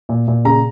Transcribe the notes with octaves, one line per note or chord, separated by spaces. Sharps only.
A#2
A#2
C#3 A#5